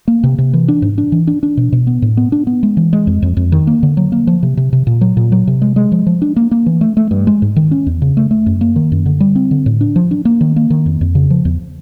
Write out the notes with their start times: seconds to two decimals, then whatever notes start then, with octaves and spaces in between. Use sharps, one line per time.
0.08 A#3
0.23 C3
0.38 C3
0.53 E3
0.68 D4
0.82 G#2
0.98 D4
1.12 E3
1.27 D4
1.43 D4
1.57 B2
1.72 B2
1.87 B3
2.02 A2
2.17 B3
2.32 D4
2.47 B3
2.63 G#3
2.77 E3
2.93 G#3
3.07 F2
3.22 F2
3.37 F2
3.52 D#3
3.67 A#3
3.83 D3
3.97 F#3
4.12 A#3
4.27 F3
4.43 C3
4.57 C3
4.73 C3
4.87 A#2
5.01 F#3
5.17 A#2
5.32 F#3
5.47 C3
5.62 G#3
5.76 G#3
5.92 F3
6.07 F3
6.22 D4
6.36 A#3
6.51 A#3
6.66 E3
6.81 A3
6.97 A3
7.11 G2
7.27 G#3
7.42 G#2
7.56 D#3
7.71 C#4
7.87 E2
8.02 C#3
8.17 A3
8.31 A3
8.46 F#2
8.61 A#3
8.76 D#3
8.92 F#2
9.06 D3
9.20 G3
9.35 C4
9.51 D3
9.66 A2
9.81 D4
9.96 F3
10.11 D4
10.25 A#3
10.41 D#3
10.56 A#3
10.70 D#3
10.86 F2
11.01 F2
11.15 C#3
11.30 F3
11.45 E2